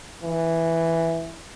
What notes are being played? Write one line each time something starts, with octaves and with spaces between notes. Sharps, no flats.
E3